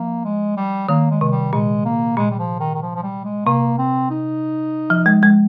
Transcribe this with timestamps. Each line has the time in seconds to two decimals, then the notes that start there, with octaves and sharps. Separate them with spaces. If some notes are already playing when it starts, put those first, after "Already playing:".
Already playing: F3 A#3
0.25 G#3
0.57 G3
0.89 D#3 A#3
1.11 G#3
1.21 C3 G#3
1.31 G3
1.53 A#2 G#3
1.85 A#3
2.17 A#2 G#3
2.31 G3
2.39 F3
2.60 D#3
2.75 D#3
2.82 F3
2.96 F3
3.03 G3
3.25 G#3
3.46 C3 A#3
3.78 C4
4.10 D#4
4.90 F3
5.06 G#3
5.23 G#3